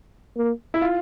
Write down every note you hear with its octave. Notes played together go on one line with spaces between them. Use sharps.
A#3
E4
F4